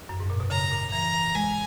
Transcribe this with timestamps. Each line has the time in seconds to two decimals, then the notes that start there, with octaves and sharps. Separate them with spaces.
0.09 F#2
0.20 G#2
0.30 A#2
0.40 B2
0.50 C#3 A#5
0.71 A#2
0.92 E3 A#5
1.34 G#3 G#5